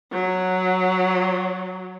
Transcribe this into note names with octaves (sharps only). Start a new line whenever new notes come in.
F#3